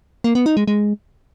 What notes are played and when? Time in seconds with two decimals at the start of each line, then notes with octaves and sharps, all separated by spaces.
0.24 A#3
0.35 B3
0.46 D#4
0.57 G#3
0.68 G#3